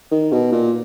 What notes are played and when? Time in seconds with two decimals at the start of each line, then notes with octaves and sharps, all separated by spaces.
0.12 D#3
0.32 B2
0.52 A#2